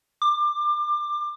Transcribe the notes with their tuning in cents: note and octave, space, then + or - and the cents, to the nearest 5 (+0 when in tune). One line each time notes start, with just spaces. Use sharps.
D6 +25